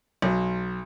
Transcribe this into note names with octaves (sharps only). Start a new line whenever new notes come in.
B1 F#3